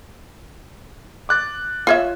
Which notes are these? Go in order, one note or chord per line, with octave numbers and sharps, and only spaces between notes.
D6 F#6 A6
F4 C#5 E5